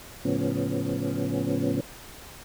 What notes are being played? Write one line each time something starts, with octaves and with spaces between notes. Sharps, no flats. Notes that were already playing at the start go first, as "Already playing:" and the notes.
A2 C#3 F3 B3 C#4